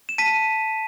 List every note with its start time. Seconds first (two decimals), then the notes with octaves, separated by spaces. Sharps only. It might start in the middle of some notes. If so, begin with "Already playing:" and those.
0.09 E7
0.18 A5 B6 D#7